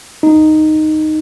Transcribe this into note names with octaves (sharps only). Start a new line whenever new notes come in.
D#4